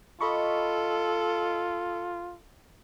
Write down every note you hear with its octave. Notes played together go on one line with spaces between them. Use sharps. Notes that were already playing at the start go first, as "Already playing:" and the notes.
F4 A4 D#5 B5 C#6